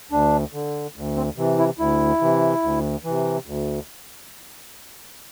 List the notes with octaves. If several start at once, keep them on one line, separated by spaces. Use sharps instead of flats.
D2 D4
D3
D2
C4
C3 E3
E4
D2 E4
C3 E3
D2
C3 E3
D2